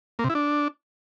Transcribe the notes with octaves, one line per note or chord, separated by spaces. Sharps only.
A#3
C3
E4
D4